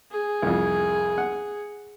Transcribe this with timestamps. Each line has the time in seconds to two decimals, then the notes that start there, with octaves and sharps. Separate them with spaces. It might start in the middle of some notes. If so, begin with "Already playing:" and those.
0.11 G#4
0.42 C2 F2
1.18 F#5